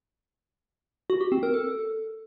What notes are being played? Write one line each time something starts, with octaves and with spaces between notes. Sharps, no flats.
F#4
G4
C4
A#4
A4